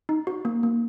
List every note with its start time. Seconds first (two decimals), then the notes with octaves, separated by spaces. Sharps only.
0.09 D#4
0.27 F#4
0.45 A#3
0.63 A#3